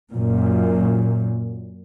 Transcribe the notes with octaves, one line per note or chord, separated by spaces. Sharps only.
F#2 A#2